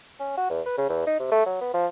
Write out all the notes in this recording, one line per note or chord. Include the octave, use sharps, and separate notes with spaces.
C#4
F#4
E2
B4
C#3
E2
D#4
C3
A3
F#3
B3
F3